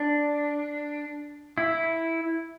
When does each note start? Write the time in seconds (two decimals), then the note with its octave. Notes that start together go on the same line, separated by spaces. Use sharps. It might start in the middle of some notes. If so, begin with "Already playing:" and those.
Already playing: D4
1.58 E4